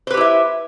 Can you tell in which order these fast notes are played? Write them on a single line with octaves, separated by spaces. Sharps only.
C5 B4 G4 E4 E5